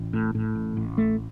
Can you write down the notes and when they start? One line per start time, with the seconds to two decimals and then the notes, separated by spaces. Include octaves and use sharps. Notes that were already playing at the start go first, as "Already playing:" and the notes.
Already playing: A1
0.13 A2
0.35 A2
0.55 A1
0.77 A1
0.98 A3